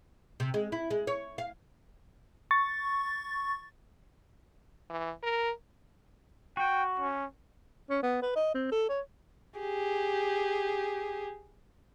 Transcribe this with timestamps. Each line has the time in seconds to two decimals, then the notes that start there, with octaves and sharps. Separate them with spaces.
0.40 C3
0.54 G#3
0.72 E4
0.91 G#3
1.07 C#5
1.38 F5
2.51 C#6 A6
4.90 E3
5.23 A#4
6.57 F#4 G5
7.00 C#4
7.90 C#4
8.03 B3
8.22 B4
8.36 D#5
8.54 C4
8.72 A4
8.89 C#5
9.60 G4 G#4